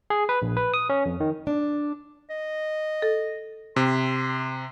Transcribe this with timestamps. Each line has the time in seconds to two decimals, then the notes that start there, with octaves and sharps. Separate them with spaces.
0.10 G#4
0.29 B4
0.42 A#1
0.57 B4
0.74 D#6
0.89 C#4
1.06 F2
1.20 D#3
1.47 D4
2.30 D#5
3.02 A4
3.76 C3 C6